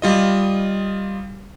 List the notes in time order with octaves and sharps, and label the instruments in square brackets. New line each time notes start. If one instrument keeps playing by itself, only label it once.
[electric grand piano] G3 F4 D#5